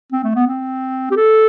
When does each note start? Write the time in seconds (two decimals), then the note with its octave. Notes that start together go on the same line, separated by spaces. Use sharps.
0.12 C4
0.24 A3
0.35 B3
0.47 C4
1.11 G4
1.16 A4